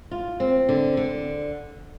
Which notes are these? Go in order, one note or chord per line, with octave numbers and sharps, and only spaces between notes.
F4
C4
D3
D3